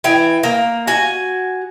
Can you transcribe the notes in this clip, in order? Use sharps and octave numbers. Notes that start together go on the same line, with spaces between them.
E3 G5 G#5
A#3
F#4 G#5